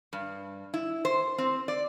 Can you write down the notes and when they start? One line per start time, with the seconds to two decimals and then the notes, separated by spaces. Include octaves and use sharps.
0.13 G2
0.74 E4
1.05 C5
1.38 C4
1.68 D5